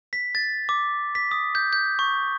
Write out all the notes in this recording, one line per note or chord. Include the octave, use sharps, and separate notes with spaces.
B6
A6
D6
B6
D#6
G6
G6
C#6